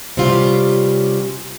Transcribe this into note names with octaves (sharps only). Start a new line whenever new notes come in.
C3 G3 C#4 F4 G4